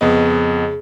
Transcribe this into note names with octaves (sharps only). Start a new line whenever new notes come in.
F2 C#3 B3 D#5